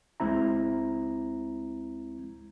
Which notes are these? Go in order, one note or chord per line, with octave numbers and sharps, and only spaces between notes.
C#2 G#3 C4 E4 A#5